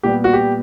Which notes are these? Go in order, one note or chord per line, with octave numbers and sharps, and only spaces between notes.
A#2 G3 B3 G4
F#4
G4